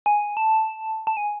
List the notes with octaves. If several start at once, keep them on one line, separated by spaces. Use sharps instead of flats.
G#5
A5
A5
G#5